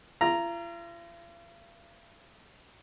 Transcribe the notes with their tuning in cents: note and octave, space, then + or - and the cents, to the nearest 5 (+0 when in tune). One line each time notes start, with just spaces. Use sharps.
F4 -45 A#5 +0